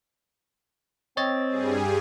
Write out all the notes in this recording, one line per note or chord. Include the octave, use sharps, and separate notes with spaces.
C4 C#5 D#5 A6
G2 G3 G#4